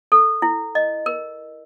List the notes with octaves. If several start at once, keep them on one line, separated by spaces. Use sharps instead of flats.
A4
E4
D#5
A#4